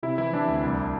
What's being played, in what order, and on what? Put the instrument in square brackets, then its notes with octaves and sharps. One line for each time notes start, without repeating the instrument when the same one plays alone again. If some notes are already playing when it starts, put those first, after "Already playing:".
[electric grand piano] C3 E4
E3 E4
E3 D4
D2
C2